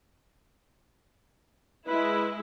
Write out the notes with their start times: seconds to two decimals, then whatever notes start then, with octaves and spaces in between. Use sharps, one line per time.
1.87 G#3 E4 B4